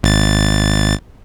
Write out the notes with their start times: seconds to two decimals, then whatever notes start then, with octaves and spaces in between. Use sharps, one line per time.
0.03 G#1 A6